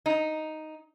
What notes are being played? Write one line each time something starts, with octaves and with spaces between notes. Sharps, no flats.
D#4